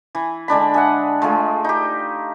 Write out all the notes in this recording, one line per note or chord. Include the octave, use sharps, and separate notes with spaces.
E3
D3 G#3 D4 B5
G#4 E5 F#5
G#3 A3 F4 G#4
D#4 G4